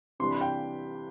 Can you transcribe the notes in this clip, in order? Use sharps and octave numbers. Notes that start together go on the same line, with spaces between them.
C3 E3 G3 D4 C6
B5
G5